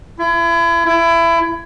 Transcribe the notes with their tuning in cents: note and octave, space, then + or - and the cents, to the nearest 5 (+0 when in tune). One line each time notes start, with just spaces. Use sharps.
E4 +35
E4 +25